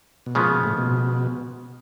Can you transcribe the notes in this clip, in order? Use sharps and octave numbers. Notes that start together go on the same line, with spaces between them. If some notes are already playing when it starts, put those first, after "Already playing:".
B2
A#2 C#3 F3 G#3 B3
B2
A2
B2